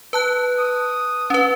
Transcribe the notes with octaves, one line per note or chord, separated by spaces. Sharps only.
B4 A5 F#6
D#6
C#4 B4